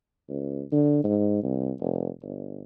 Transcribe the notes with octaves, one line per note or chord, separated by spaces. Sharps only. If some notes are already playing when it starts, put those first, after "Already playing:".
C#2
D3
G#2
C2
F1
G1